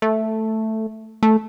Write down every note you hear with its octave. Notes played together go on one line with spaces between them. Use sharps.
A3
A3